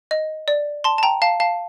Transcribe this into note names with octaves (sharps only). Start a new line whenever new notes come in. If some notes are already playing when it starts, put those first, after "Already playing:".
D#5
D5
A5 C6
A5
G5 A#5
F5 A5
F5 A5